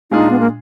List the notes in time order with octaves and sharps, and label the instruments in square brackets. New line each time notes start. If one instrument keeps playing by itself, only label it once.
[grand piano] A#2 G#3 D4 F4 G#4 [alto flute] D#4
[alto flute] B3
A#3